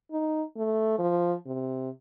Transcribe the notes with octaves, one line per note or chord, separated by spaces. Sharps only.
D#4
A3
F3
C3